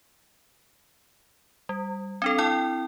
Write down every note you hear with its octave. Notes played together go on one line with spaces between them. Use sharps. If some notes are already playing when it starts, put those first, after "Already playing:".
G3
C4 D4 A4
C4 E4 G5